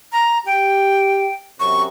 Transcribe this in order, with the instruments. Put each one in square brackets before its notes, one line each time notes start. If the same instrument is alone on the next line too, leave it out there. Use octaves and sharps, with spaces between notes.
[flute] A#5
[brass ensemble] G4 [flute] G5
[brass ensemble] F#2 C3 [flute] C#6